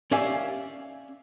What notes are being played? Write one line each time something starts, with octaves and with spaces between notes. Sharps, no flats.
C#4 G4 D5 E5 F5 G#5